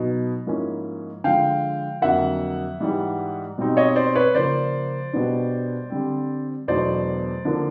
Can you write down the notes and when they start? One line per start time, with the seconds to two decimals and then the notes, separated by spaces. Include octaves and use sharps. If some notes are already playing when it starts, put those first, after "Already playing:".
Already playing: B2 F#3 B3 D#4
0.47 G#2 F3 A#3 C#4 E4
1.24 D3 F3 G#3 F5 G5
2.02 F2 D3 F#3 A#3 E5 F#5
2.80 G#2 E3 G3
3.58 B2 G3 C4 D#4
3.77 C#5 D#5
3.96 C5 D5
4.15 B4 C#5
4.35 C#3 F3 A#3 C5 D5
5.13 B2 G3 B3 D4
5.90 D3 G3 C4
6.68 E2 B2 F#3 A3 D4 C5 D5
7.45 D3 F3 A#3 D4